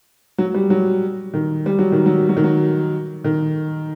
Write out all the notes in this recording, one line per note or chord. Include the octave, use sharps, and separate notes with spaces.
F#3
G3
F#3
D#3
G3
F#3
D#3
F#3
F#3
D#3
F#3
D#3